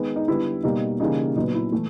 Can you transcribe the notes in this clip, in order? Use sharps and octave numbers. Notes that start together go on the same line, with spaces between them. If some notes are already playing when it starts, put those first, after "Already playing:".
Already playing: D#3 G#3 B3
D#4
D3 G3 B3 E4
B2 G3 A#3 D#4
C#3 E3 G3 A#3 D#4
A#2 F#3 B3 D#4
E4
E3 A3